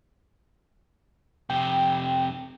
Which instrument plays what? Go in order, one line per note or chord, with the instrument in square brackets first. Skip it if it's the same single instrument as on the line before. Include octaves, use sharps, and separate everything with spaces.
[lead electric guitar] F2 C3 [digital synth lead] G5